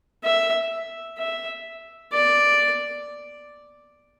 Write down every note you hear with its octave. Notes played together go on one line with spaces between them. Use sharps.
E5
E5
D5